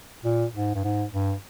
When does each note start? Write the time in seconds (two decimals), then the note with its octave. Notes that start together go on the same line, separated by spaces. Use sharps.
0.24 A#2
0.54 G#2
0.75 G2
0.84 G#2
1.13 G2